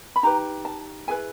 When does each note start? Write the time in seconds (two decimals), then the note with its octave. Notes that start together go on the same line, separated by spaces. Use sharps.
0.16 B5
0.23 D#4 G4 B4 A#5
0.65 A5
1.07 E4 G#4 B4 G#5